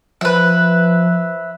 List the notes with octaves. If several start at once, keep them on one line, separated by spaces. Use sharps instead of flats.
F3 B4 E5